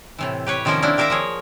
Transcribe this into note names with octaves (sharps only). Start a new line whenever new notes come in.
A2 C3 E3
G4 B4 C#5
C3 D#3 F3 A#3 C#4 A#4
A#3 C4 D4 E4
D#3 G4 A#4 E5 F5 A#5
F3 A#3 G#4 C#5